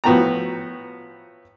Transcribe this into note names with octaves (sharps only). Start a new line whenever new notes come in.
A2 F3 B3 F#4 G5 A#5